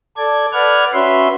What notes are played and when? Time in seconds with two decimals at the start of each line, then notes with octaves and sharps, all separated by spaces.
0.17 A4 D5 G#6
0.53 B4 D5 F#5 F6 G#6
0.94 C#4 F#4 B4 E5 C6